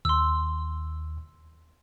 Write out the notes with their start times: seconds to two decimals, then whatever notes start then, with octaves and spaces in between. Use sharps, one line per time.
0.05 D#2 C6 E6